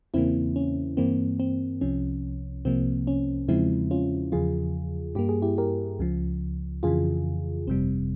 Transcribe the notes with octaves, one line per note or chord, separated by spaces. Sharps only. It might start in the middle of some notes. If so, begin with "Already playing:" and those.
E2 C#3 E3 A#3 C4 E4
C#4
G2 E3 A#3 C4
C4
C2 C3 F3 C#4
C2 C3 F3 A#3 C4
C#4
E2 C#3 F3 G#3 C4 E4
C#4 F4
E2 C#3 F3 F4 G#4
G2 G3 A#3 G4
G#4
E4 G4
G4 A#4
C#2 C#3 F3
F2 C#3 E3 F4 G#4
G1 F2 C3 G3 C4